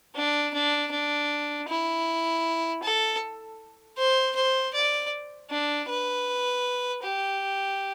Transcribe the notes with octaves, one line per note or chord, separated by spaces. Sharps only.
D4
D4
D4
E4
A4
C5
C5
D5
D4
B4
G4